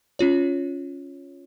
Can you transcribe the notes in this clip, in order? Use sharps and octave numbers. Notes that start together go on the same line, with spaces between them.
C#4 F4 C#5